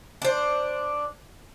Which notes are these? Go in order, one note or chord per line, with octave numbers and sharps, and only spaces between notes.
D4 C5